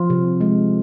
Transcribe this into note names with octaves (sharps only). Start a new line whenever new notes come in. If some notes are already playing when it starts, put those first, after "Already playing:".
Already playing: F3 F4
C3
G#3